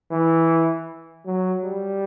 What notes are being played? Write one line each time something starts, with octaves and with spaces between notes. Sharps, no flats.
E3
F#3
G3